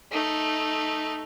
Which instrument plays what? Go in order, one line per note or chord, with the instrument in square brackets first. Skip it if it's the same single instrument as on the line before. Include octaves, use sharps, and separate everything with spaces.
[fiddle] A3 D#4